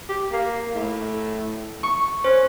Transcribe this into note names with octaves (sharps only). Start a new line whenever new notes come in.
G4
A#3
A2
C#6
C#4 C5